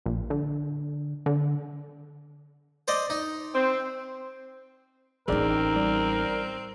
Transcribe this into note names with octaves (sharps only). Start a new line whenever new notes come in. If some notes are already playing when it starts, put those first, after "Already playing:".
A#1
D3
D3
C5 D5 D#5
D#4
C4
A1 C4 D#4 G#4 A#4 D5
G3 D5